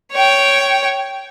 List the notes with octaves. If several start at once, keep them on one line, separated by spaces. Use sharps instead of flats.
C#5 G5